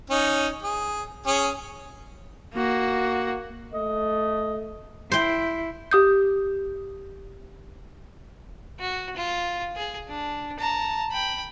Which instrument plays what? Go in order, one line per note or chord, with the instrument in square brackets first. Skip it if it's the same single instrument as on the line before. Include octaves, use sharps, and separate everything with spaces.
[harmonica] C#4 D#4
G#4
C#4 G#4
[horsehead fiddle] A#3 F#4
[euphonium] A3 [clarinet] D#5
[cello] E4 [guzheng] C5 G5
[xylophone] G4 D#6 G6
[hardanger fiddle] F#4
F4
G#4
D4
A5 A#5
G5 B5